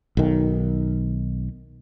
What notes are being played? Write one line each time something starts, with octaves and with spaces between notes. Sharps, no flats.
B1 D#3